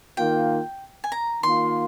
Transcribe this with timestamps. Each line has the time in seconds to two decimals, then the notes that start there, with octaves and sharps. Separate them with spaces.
0.17 D#3 A#3 F4 G5
1.04 G#5
1.12 A#5
1.43 D#3 A#3 F4 C6